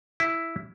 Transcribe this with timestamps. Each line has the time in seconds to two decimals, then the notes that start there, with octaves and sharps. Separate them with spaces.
0.20 E4